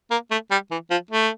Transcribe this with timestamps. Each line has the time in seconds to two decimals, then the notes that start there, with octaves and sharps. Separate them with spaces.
0.11 A#3
0.31 A3
0.51 G3
0.71 E3
0.90 F3
1.11 A3